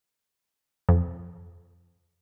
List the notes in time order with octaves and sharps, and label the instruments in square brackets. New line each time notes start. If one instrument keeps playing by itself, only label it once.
[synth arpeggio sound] F2